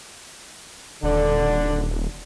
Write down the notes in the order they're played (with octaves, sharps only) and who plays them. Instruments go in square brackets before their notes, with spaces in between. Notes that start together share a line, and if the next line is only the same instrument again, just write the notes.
[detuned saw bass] D#1 [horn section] D3 D4